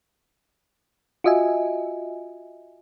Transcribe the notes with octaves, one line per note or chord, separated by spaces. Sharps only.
F4 F#4 D#5 E5 G#5